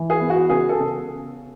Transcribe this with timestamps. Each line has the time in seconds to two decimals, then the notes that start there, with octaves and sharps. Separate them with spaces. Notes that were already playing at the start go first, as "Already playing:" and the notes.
Already playing: E3
0.10 G#4
0.20 B3
0.30 F#4
0.50 C#3 G#4
0.69 A4
0.79 C#3